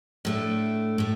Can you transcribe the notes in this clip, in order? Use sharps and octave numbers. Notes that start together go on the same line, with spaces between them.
A2 A3 D4
A2 A3